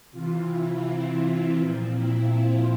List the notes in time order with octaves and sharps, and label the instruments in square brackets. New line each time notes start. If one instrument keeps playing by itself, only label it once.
[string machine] C3 E3 F4
E4
C4
C4
A#2 F3 C4
E4
F4